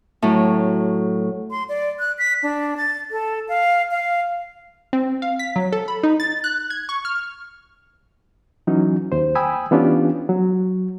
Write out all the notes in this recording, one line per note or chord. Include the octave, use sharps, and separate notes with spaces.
A2 F#3
C6
D5
F#6
B6
D4
A6
A4
F5
F5
C4
F5
B6
F#3
A4
B5
D#4
A6
F#6
G#6
C#6
F6
E3 F#3 C#4 D#4
D#2 C5
G5 G#5 B5 D#6 E6
E3 B3 C#4 D4 F4 G4
F#3